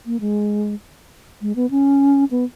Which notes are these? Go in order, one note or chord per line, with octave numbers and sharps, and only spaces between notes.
A#3
G#3
G#3
B3
C#4
B3